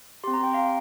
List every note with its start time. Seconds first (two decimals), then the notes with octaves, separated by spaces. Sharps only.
0.24 C4 G4 C6
0.34 A#5
0.43 G5
0.53 F5 A#5